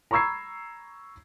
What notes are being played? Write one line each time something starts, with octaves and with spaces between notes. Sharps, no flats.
A#5 B5 C#6 E6 G#6 C7